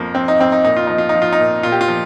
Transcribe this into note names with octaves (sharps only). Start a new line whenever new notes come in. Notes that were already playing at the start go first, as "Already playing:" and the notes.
Already playing: F2 F3 A#3
F3 C4
D#4
F2 C4
D#4
A#2 D#4
F4
F3 D#4
F4
D#4
F3
F4
D#4
A#2
A#2 F4
G4
F4
F3